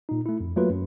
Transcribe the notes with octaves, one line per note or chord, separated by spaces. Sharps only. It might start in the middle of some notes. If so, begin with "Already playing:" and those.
A#2 D#4
A3 E4
F2
F#3 A3 A#3 F4 F#4 B4
F#2